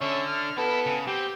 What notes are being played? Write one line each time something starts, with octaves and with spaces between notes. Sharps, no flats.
D3 C#4 E5
F6
B3 E4 A4
C#3
C4 G4